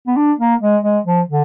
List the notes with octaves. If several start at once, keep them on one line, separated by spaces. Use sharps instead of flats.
B3
D4
A#3
G#3
G#3
F3
D3